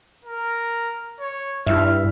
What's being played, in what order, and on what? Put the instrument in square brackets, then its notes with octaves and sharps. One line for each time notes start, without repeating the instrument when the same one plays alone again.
[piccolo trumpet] A#4
C#5
[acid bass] G2 [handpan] E4 E5 [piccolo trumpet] F6